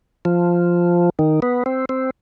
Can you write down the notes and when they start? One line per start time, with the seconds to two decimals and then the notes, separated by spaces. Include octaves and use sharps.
0.25 F3
1.19 D#3
1.42 B3
1.66 C4
1.89 C4